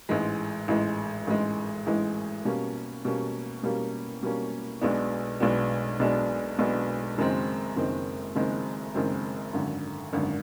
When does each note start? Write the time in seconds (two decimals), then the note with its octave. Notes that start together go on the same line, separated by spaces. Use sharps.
0.09 A1 G#2 E3 G#3
0.68 A1 G#2 E3 G#3
1.27 A1 G#2 E3 G#3
1.86 A1 G#2 E3 G#3
2.45 B2 G3 A#3 C#4
3.05 B2 G3 A#3 C#4
3.63 B2 G3 A#3 C#4
4.23 B2 G3 A#3 C#4
4.81 B1 B2 G#3 B3 D4
5.40 B1 B2 G#3 B3 D4
5.99 B1 B2 G#3 B3 D4
6.58 B1 B2 G#3 B3 D4
7.18 F#1 F#2 D#3 G#3 C4
7.76 F#1 F#2 D#3 G#3 C4
8.36 F#1 F#2 D#3 G#3 C4
8.95 F#1 F#2 D#3 G#3 C4
9.53 G#1 F#2 D3
10.13 G#1 F#2 D3